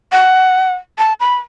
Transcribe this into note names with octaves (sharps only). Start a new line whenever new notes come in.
F#5
A5
B5